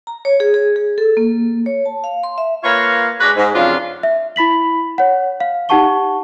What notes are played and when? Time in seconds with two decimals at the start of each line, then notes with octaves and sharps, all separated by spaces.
0.07 A#5
0.25 C#5
0.40 G#4
0.54 G#4
0.76 G#4
0.98 A4
1.17 A#3
1.66 C#5
1.86 A5
2.04 F5
2.24 C6
2.38 E5
2.64 A#3 F4 B4 C#5
3.20 G#3 D4 F#4 B4
3.36 G#2
3.54 F2 C#3 F#3 D4 F4
4.03 E5
4.36 E4 B5 B6 F#7
4.98 C#5 F#5
5.40 F5
5.69 D#4 G4 F#5 A5 C#6 G7